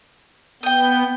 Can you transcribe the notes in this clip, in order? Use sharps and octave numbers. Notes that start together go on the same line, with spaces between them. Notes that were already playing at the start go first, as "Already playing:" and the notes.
B3 G5 D#6 G6